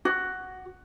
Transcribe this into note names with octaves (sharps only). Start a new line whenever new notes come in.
F#4